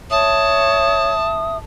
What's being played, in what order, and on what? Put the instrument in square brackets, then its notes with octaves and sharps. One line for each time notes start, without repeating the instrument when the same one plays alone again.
[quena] C#5 [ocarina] E5 [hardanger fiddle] A5 [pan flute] D#6